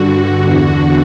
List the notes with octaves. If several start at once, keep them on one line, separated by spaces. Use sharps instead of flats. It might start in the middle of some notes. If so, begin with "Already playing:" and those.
Already playing: G2 D3 F#4
E2 D3